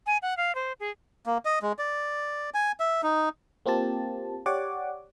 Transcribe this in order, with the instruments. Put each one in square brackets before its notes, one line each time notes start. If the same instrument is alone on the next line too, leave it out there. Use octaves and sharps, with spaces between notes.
[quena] G#5
F#5
F5
C5
G#4
[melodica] A#3
D#5
G#3
D5
G#5
E5
D#4
[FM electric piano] A#3 C4 F4 G4 A5
G4 C#5 D5 F#5 D6